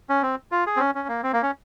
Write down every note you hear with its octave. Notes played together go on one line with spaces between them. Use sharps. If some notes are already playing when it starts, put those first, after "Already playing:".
C#4
C4
F4
G#4
C4
C#4
C#4
A#3
C4
A#3
C#4